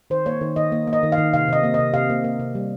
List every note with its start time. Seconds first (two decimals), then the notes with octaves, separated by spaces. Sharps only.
0.10 D#3 C5
0.26 A#3 C#5
0.41 D#3
0.56 D#3 D#5
0.72 A#3
0.87 A#3
0.93 D#5
1.03 D#3
1.12 F5
1.18 D#3
1.34 C3 F5
1.48 C3 D#5
1.64 A#3
1.74 C3 D#5
1.94 C3 F5
2.10 A#3
2.24 A#3
2.40 C3
2.55 G3